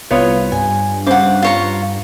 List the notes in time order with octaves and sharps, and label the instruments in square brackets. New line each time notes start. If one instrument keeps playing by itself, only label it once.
[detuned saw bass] C2 [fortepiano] B3 F4 C#5
[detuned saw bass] G2 [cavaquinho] G#5
[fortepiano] C#3 C5 [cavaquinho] F#5 D6
[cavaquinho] F4 C#5 A#5